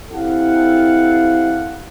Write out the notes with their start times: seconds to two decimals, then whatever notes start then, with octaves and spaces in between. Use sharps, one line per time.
0.12 C4 E4 G4 A4 F5 F#5